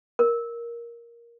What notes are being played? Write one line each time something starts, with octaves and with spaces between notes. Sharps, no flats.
A#4